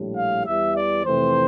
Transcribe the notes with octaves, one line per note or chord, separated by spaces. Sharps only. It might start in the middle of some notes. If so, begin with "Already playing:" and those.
Already playing: A#1 A2 G3
F5
E2 E3 G3 E5
D5
F2 C3 E3 A3 C4 C5